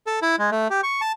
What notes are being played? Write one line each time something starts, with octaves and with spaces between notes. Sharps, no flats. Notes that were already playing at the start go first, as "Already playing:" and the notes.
A4
E4
G#3
A3
G4
C#6
A5